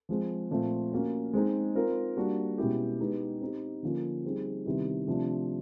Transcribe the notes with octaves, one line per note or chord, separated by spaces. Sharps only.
F3 G#3 C4
A#2 F3 A3 C4 F4
A#3 C#4 F#4
G#3 C4 D#4
C4 F4 A#4
G3 A#3 D4 F#4
B2 G#3 C#4 E4 G4
G#3 B3 D#4 G4
C4 D#4 G4
D3 F3 A#3 C#4 F4
G3 C4 D#4 G#4
C3 D#3 G3 B3 E4
C3 F3 A3 D4